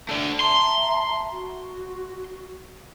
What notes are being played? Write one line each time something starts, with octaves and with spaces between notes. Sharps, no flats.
A3 D4
E5 A5 A#5 C6
F#4